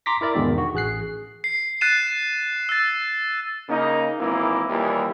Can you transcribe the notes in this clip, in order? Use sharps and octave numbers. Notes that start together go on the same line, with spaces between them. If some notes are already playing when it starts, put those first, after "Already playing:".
A#5 C6 D6 A#6 B6
E4 A#4 D5 E5
E2 G#2 B2 D3 D#3
F#4
A1 G#4 F#6 C7
C7
F#6 A6 C7 D#7 E7
E6 A6
C#3 A#3 D#4
G#1 E3 A#3 E4
D#2 A#2 E3 G3